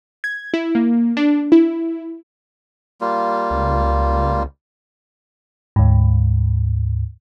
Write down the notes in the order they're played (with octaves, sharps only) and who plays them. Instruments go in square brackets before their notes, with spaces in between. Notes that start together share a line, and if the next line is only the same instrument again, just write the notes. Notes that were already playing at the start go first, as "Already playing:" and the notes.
[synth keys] G#6
E4
A#3
D4
E4
[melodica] G3 A#3 F4
[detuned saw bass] C#2
[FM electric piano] D2 G#2